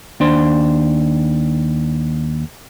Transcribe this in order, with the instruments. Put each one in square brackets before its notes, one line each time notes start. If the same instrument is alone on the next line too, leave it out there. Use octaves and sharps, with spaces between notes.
[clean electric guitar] D#2 D4 C5